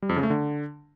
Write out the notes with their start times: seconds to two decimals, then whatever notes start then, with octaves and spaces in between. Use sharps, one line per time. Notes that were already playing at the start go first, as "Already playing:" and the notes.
0.02 G3
0.09 F2
0.16 C#3
0.23 A3
0.30 D3